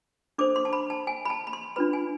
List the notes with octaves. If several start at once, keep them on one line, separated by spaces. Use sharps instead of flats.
D4 A4 C5 D6
C6
A5
B5
A5
G#5
B5
A5
B5
C6
D4 F4 B4 B5
G#5